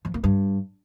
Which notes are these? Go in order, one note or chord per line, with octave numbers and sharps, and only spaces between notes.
F3
A#3
G2